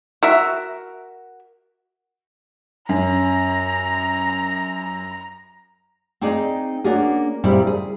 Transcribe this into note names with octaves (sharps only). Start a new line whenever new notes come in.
F#4 A#4 E5
F#2 A#5
C4 D#4 G#4 D5 D#5 F5
A#3 C#4 D4 F4 F#4 G#4
A#2 C#3 G3 C4 E4 G4
G#4